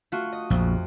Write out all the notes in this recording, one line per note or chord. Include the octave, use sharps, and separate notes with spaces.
A3 F4 F#4
D#5
A#1 F2